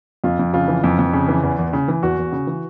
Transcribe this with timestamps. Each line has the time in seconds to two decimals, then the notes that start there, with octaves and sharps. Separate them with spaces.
0.24 F2 F4
0.39 F2
0.53 C#3 F4
0.68 E3
0.84 F2
0.99 F2
1.13 C#3
1.28 E3
1.43 E2
1.59 E2
1.73 C#3
1.88 E3
2.03 E2 F#4
2.18 E2
2.32 C#3
2.47 E3